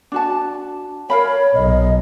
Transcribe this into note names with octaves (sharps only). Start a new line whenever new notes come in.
D4 F#4 A5
A#4 C#5 F5 B5
B1 D#5